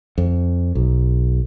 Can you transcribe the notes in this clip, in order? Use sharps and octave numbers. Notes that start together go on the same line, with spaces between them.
F2
B1